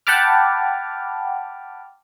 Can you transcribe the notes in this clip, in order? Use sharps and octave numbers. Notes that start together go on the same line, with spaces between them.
F#5 G5 A5 B5 D6 F6